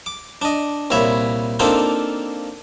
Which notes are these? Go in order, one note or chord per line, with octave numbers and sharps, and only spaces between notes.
D6
D4 D#5
C2 A#2 C#5 E5 B5
A#3 C4 D4 D#4 F4 A4